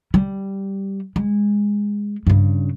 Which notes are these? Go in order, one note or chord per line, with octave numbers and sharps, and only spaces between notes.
G3
G#3
G2 C#3